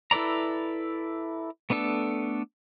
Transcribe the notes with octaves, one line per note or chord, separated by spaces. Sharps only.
E4 A4 B4 D5 A#5
A3 B3 D4 A4